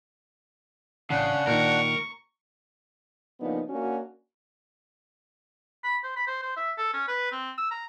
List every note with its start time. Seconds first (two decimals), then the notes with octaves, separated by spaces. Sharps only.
1.10 A1 C#3 D4 F#5
1.47 A#2 D#3 A#4 A#5 C#6
3.40 C#3 F3 A#3 B3 D4 D#4
3.69 A#3 C#4 D4 F#4
5.84 B5
6.04 C5
6.16 B5
6.27 C5
6.42 C5
6.57 E5
6.78 A4
6.93 C#4
7.07 B4
7.32 C4
7.58 E6
7.71 A#5